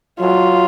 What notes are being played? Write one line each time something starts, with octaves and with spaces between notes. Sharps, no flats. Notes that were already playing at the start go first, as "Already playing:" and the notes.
F#3 F4